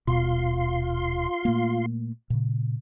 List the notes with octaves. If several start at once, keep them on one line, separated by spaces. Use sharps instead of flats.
D#1 B2 F4 C6
A#2 A3 A#3
A#2 C#3